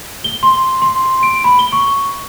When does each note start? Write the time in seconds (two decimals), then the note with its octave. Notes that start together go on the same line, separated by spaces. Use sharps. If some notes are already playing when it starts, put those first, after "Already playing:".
0.24 G7
0.43 C6
0.82 C6
1.23 D7
1.44 B5
1.59 G7
1.72 C#6